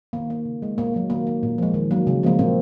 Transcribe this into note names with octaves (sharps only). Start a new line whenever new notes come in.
D#3 A#3
A#3
C#3
G#3
A#2 A#3
F#3 A#3
D#3 A#3
A#3
A#2
F3 G#3
D#3
F#3 A#3
C#3
F3 G#3 A#3
A#2 C4